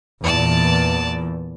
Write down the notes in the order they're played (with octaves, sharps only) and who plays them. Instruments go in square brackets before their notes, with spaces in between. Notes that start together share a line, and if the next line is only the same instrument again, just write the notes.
[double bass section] E2 A#2 E3 [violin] D5 A5